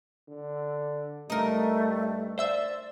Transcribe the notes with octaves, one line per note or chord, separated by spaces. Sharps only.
D3
G2 A3 D#4 A#4
C5 D5 E5 E6